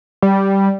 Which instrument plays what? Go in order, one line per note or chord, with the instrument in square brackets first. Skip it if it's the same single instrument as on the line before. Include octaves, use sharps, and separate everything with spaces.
[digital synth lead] G3